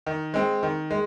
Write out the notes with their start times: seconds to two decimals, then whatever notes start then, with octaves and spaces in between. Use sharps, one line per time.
0.06 D#3
0.34 G#3 C4
0.63 D#3
0.91 G#3